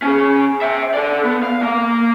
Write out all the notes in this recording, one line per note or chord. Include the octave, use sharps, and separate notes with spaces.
C#4 G#4
E5 G5
A4 D5
B3
F5
A#3 F5